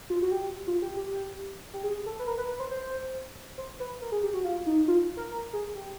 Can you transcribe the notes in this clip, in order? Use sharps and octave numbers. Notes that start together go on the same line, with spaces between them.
F4
F#4
G4
F4
G4
G4
G4
G#4
A4
B4
A#4
B4
B4
C5
C5
C5
B4
A#4
G#4
G4
F#4
F4
D#4
F4
A#4
A#4
G#4
G4